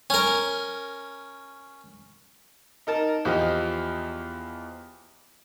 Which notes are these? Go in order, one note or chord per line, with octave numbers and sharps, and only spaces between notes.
C#4 A#4
D#4 A#4 A5
E2 F3 G4 D#5